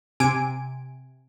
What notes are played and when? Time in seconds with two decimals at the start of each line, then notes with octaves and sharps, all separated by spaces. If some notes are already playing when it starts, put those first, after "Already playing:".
0.20 C3 G#5 D7